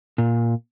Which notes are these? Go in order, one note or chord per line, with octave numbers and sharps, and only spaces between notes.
A#2